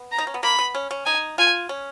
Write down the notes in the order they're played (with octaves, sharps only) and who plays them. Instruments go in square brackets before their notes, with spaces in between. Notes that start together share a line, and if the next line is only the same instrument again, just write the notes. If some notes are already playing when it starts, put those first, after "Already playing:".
Already playing: [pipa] B3
[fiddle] A#5
[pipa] D#4
C#4
B3
[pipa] A#3 [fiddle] B5
[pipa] B3
C#4
C#4
[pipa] D#4 [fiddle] G#5
[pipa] F4 [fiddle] G#5
[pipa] C#4